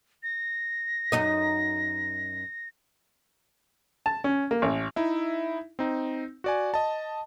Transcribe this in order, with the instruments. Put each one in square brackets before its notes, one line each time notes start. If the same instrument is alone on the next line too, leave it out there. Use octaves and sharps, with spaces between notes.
[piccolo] A#6
[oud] F#2 D#4 D#5
[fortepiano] A5
C#4
A#3
A1
[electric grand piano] D#4 E4 E5
C4 D#4
F#4 D5 G#5
D#5 A5